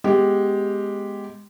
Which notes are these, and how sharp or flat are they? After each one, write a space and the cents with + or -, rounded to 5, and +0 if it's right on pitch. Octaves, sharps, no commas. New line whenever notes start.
G#3 +0 B3 +0 G4 +0